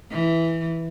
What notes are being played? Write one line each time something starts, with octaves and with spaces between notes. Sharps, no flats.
E3